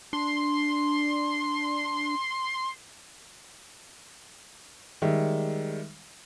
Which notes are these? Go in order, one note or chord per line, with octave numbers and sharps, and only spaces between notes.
D4 C6
D#3 G3 G#3 E5